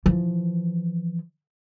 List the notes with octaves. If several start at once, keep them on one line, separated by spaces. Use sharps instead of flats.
E3 F3